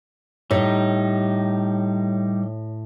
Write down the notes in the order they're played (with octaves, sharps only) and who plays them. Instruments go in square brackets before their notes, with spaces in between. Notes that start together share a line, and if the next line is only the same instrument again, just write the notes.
[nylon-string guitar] A2 [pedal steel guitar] G3 D#4 [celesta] C#5